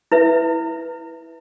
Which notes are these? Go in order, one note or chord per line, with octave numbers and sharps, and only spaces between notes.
E4 B4 E5